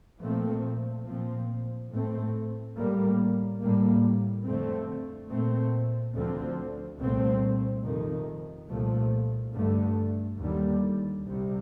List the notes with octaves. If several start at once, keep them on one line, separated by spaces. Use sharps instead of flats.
A#2 F3 A3 C4
A#2 F3 C4
A2 A3 C4
A2 G3 A#3
A2 G3 A#3
F2 D3 A3 C4
A#2 A3 C4
D2 D3 F3 C4
C2 A#2 A3 C4
F2 C3 D#3
C2 A#2 F3 A3
G2 D3 A3
D#2 D3 G3
C2 C3 G3